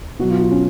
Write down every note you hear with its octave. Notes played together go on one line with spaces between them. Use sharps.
B2 F#3 F#4
F4
F4
C#4